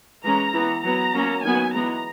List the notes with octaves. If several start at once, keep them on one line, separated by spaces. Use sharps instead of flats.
E3 G#3 C#4 A#5
E3 B3
F#3 B3 A#5
F#3 A#3 C#4
D#3 F#3 B3 G#5
E3 G#3 B3 A#5